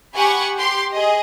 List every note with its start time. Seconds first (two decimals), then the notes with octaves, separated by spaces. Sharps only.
0.14 G4 F#5 G#5 B5 C#6
0.58 G4 C6
0.92 G#4 D#5